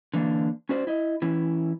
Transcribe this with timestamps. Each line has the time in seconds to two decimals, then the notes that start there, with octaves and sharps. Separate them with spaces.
0.14 D3 E3 A#3 D4
0.69 C#4 F#4 C5 D5
0.87 E4 D#5
1.22 E3 C#4 E4